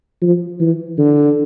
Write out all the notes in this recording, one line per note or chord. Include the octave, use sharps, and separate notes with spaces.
F3
E3
D3